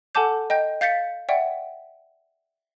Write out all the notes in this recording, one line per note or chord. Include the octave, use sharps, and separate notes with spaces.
A4 F#5 G#5 A5 D6 G6
D#5 G5 G6
F5 G6 A6 B6 C#7
D5 E5 F#5 G5